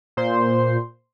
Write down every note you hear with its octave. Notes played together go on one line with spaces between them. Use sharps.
A#2 C5 C6